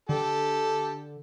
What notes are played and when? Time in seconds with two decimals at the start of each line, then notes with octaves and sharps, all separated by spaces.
0.09 D3 G4 A4